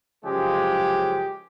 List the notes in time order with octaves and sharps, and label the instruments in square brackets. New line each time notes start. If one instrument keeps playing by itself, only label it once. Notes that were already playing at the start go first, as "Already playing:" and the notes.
[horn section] F#2 C#3 F3 G#3 G4